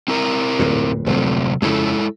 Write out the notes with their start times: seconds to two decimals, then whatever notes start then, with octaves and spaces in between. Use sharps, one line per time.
0.08 C4 E4 A#4
0.59 D1 F2 A#2
1.06 D1 F2 C3 F#3 C4
1.62 F2 C#3 G#3 E4 A4